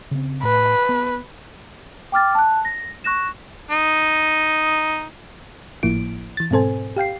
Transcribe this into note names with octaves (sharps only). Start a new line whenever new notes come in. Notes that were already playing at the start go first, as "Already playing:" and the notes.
C#3 C4
A2 B4
B3
G5 D6 F6 A6
A5 F#6
A#6
C#6 F#6 A#6 E7
D#4
G#1 A2 F3 A#3 E4 D7
E3 A6
G#2 B2 C4 A4 C5 G#5
G4 F5 G5 C7